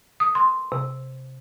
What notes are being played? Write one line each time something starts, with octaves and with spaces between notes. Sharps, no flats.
D#6
C6
C3